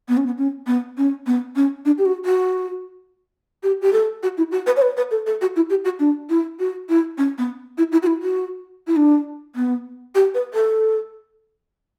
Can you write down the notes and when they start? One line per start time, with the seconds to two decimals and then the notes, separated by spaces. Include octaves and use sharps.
0.09 B3
0.17 C#4
0.26 B3
0.38 C#4
0.67 B3
0.97 C#4
1.27 B3
1.56 C#4
1.85 D4
1.98 G4
2.05 F#4
2.25 F#4
3.63 G4
3.82 G4
3.93 A4
4.23 F#4
4.38 E4
4.51 F#4
4.66 B4
4.76 C#5
4.82 B4
4.97 B4
5.11 A4
5.26 A4
5.41 F#4
5.56 E4
5.70 G4
5.85 F#4
5.99 D4
6.29 E4
6.59 F#4
6.89 E4
7.18 C#4
7.38 B3
7.78 E4
7.92 E4
8.03 F#4
8.07 E4
8.22 F#4
8.87 E4
8.96 D4
9.55 B3
10.15 G4
10.34 B4
10.54 A4